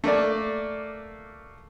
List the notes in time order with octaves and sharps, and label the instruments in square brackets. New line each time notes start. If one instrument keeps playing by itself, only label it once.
[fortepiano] A3 A#3 D5